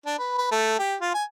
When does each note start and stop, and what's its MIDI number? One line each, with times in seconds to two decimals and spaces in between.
0.06 0.17 62
0.19 0.34 71
0.38 0.49 71
0.51 0.79 57
0.79 0.95 67
1.01 1.12 65
1.14 1.24 80